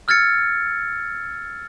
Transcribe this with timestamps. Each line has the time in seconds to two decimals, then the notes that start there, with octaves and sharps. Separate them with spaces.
0.08 E6 F6 G#6 A6 C#7